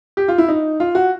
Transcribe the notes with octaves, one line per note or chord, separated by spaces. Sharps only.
G4
F4
E4
D#4
F4
F#4